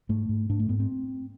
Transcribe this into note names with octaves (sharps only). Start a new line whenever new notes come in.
G#2 A3
G#2
G#2 D4
A3
G#2 B3
C4